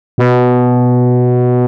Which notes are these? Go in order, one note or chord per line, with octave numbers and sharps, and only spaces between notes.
B2